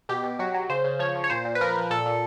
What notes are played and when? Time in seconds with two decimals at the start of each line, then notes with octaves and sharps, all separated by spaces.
0.09 B2 G4
0.23 B2
0.39 F#3 F#4
0.54 F#3
0.69 C#3 C5
0.84 C#3
0.99 F3 C#5
1.16 F3
1.24 C#5
1.30 A#2 C5
1.45 A#2
1.55 B4
1.61 F3 A#4
1.75 F3
1.90 A#2 A4
2.06 A#2